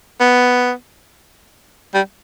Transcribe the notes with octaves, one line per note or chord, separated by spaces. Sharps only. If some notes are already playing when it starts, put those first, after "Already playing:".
B3
G3